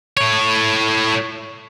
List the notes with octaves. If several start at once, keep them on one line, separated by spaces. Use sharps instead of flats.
A2 C#5